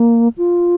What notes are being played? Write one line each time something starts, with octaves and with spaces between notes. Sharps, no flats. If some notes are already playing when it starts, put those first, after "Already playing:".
Already playing: A#3
F4